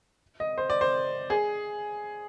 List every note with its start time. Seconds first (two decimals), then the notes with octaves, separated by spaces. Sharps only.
0.40 D#5
0.58 C5
0.70 D5
0.81 C5
1.30 G#4